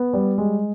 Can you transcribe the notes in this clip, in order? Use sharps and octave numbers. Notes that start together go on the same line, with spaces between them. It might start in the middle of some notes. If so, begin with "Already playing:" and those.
Already playing: B3
G3
G#3